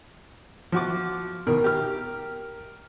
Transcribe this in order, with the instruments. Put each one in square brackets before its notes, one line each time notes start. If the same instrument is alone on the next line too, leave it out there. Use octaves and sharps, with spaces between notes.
[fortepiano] F3 F#4 D6
[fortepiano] B2 D#3 [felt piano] A#4
[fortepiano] G4 F6